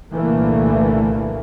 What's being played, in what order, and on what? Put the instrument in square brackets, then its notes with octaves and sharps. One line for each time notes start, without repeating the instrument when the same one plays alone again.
[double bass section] C2 A#2 D3 E3 A3 A#3